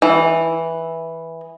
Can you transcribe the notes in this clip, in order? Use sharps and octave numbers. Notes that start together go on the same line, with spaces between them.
E3